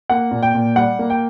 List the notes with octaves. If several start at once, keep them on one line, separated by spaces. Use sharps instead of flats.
A#3 F#5
A#2
G5
A#2
G3 F#5
A#3
G5